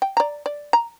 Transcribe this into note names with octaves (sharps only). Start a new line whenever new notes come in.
G5
D5 A#5
D5
A#5